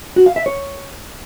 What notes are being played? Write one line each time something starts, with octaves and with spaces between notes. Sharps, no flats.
F#4
F5
E5
C#5